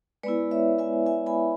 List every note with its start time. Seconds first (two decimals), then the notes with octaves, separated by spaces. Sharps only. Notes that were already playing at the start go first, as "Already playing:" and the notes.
0.23 G#3 B3 E4 B4 D5
0.51 C#5 E5
0.79 E5 G#5
1.06 E5 G#5
1.26 G#5 B5